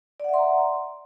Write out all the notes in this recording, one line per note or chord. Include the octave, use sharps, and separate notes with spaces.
D5 E5 F#5 A#5 C6